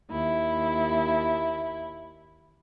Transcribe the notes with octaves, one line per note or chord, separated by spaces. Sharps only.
D#2 E4